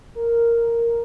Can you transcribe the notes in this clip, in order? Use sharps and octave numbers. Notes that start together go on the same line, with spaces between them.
A#4